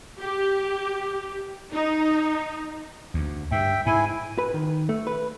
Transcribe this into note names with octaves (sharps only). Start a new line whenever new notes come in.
G4
D#4
D2
G2 E5 G5
G#2 E4 G#5
B4
D#3
A3
B4